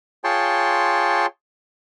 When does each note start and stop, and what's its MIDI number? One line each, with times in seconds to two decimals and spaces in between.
0.24 1.26 65
0.24 1.26 68
0.24 1.26 73
0.24 1.26 79
0.24 1.26 81
0.24 1.26 84